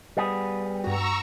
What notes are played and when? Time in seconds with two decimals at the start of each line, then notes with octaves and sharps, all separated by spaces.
0.17 G3 B3 G#4
0.84 G2 F#4 A#5 C#6 E6